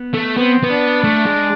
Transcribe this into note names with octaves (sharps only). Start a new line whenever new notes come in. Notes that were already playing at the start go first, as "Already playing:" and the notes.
Already playing: B3
A3
B3 C4
B3
D4
A3
G#3